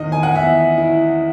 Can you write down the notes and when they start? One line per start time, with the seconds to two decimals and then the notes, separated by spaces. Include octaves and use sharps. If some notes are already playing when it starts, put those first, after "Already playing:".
Already playing: E2 D#3 D#5
0.12 G#5
0.23 F#5
0.35 E2 E5
0.78 E4